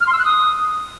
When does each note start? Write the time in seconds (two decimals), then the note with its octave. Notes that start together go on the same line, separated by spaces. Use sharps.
0.01 F6
0.07 C6
0.13 E6
0.19 F#6
0.25 D#6